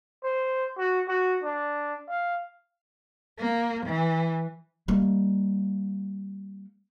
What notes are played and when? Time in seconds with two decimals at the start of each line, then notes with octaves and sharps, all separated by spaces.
0.24 C5
0.78 F#4
1.08 F#4
1.44 D4
2.09 F5
3.39 A#3
3.86 E3
4.88 G3 A#3